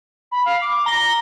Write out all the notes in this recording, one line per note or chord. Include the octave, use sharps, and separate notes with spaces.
B5
F5
D6
A#5 A#6 G7